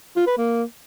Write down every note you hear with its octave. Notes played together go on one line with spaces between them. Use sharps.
F4
B4
A#3